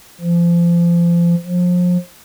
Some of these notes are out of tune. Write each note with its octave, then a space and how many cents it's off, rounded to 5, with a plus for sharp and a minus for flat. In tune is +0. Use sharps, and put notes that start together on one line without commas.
F3 -30
F3 +30